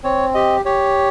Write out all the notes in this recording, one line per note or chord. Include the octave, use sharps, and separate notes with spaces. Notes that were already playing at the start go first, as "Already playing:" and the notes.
C4 C#5
G4 D#5
G4 C#5